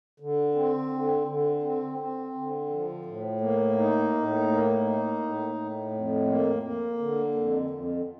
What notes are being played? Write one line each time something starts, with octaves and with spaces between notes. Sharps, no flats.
D3
C4
D3
D3
C4
C4
D3
F3
A2
A#3
D#4
A2
A#3
D#4
A2
A2
F2
A#3
A#3
D3
F2
F2